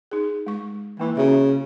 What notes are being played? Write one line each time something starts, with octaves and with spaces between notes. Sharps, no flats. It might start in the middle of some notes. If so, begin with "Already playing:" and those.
D#4 G#4
G#3 C#6
E3 A#3 E4
C#3 C#4 F#4 E5